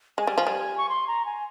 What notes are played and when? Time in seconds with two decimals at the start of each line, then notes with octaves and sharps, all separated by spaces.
0.18 G#3 G#5
0.27 G3
0.38 F3
0.47 G3
0.78 C#6
0.89 C6
1.07 A#5
1.25 G#5